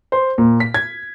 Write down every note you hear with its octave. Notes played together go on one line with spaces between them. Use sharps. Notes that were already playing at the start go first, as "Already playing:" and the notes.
C5
A#2
B6
G#6